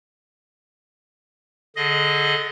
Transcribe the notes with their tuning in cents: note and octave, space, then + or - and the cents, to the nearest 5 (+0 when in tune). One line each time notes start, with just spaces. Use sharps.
D3 +0 G#4 +20 D#5 +0